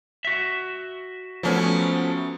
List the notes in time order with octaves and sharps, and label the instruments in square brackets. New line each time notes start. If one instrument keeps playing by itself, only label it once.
[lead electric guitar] F#4 E5
[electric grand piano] F3 A3 B3 [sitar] F#3 C#4